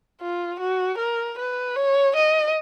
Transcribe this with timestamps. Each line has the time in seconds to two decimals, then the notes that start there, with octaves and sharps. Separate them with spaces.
0.21 F4
0.60 F#4
0.98 A#4
1.38 B4
1.76 C#5
2.16 D#5